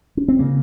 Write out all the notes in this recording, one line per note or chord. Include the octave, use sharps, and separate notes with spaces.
C#4
C4
C#3 A#3